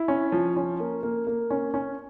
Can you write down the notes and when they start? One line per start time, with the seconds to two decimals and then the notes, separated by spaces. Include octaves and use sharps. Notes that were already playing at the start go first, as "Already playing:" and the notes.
Already playing: E4
0.08 C#4
0.32 F3
0.56 C#4
0.80 A#3
1.03 A#3
1.27 A#3
1.50 C#4
1.74 C#4